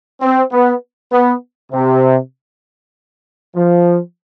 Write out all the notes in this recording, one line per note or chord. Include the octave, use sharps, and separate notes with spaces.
C4
B3
B3
C3
F3